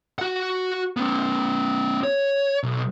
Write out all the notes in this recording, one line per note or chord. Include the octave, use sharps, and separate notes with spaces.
F#4 F#5
B3 C#4
C#5
B1